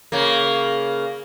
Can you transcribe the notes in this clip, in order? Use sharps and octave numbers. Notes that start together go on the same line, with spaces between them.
C#3 A#3